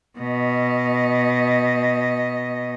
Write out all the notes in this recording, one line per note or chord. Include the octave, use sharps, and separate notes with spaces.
B2 D#5